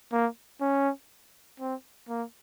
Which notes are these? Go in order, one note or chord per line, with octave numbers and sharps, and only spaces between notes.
A#3
C#4
C4
A#3